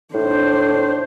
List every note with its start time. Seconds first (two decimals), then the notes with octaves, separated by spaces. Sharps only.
0.14 A2 D4 C5